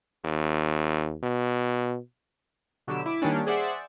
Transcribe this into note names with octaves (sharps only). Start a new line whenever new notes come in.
D#2
B2
B2 D3 F#3 G4 E7
E4 D6
D#3 G3 A#3 C#4 D4
G#4 C5 D5 E5 F#5